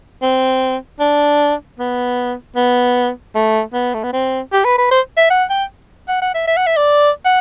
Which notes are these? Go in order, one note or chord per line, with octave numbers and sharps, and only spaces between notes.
C4
D4
B3
B3
A3
B3
A3
B3
C4
G4
B4
B4
C5
E5
F#5
G5
F#5
F#5
E5
E5
F#5
E5
D5
F#5